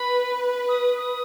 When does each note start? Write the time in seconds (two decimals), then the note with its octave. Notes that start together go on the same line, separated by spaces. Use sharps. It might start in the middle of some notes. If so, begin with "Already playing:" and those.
Already playing: B4 B5
0.69 D#6
0.98 D#6